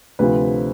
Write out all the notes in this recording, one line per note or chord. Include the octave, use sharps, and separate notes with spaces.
D2 C3 F3 B4